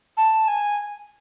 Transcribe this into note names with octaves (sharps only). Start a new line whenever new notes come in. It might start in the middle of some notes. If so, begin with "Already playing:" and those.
A5
G#5